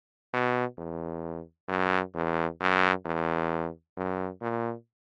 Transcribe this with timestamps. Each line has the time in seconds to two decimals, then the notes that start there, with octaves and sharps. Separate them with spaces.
0.33 B2
0.78 E2
1.69 F#2
2.15 E2
2.60 F#2
3.05 E2
3.97 F#2
4.42 A#2